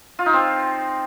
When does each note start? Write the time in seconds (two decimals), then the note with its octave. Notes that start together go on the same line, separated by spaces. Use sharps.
0.19 F4
0.26 D#4
0.33 C4